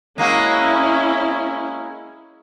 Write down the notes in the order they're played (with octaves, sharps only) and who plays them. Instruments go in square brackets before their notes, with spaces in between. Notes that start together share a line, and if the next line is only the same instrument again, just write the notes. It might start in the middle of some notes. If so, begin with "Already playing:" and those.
[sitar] G#3 A#3 F#4 [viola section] C#4 E4